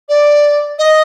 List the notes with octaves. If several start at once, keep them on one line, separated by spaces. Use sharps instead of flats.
D5
D#5